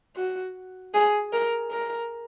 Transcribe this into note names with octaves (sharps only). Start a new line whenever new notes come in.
F#4
G#4
A#4
A#4